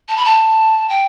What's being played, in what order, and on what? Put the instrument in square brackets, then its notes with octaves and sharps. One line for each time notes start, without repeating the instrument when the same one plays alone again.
[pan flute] A5
B5
A5
G5